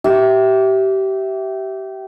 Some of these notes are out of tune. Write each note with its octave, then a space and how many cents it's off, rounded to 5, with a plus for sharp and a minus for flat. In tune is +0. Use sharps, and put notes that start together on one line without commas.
G4 -25 E5 -5